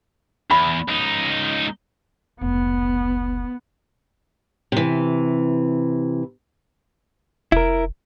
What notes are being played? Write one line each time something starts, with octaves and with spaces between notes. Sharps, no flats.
E2 B5
C#2 D#4
F1 C#2 B3
C3 E3
F1 E4 A#4